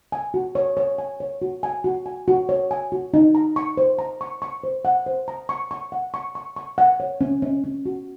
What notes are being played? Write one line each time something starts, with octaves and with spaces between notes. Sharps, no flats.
G#5
F#4
C#5
C#5
G#5
C#5
F#4
G#5
F#4
G#5
F#4
C#5
G#5
F#4
D#4
A#5
C#6
C5
A#5
C#6
C#6
C5
F#5
C5
A#5
C#6
C#6
F#5
C#6
C#6
C#6
F#5
C#5
C#4
C#4
C#4
F#4